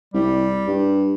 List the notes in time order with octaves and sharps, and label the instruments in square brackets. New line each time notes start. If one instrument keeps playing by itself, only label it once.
[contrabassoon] C2 [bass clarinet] G3
[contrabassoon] G2